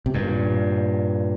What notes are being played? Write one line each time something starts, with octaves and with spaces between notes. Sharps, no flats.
C3
G2 A#2